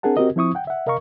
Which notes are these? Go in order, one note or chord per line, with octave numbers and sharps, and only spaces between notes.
C4 D4 G#4 A#4 F#5 A5
C4 F#4 G4 A#4 D#5
F3 C4 E4 C#6 D#6
F#5 G5
E5 F#5
C3 A#4 D#5 F5 A#5 C#6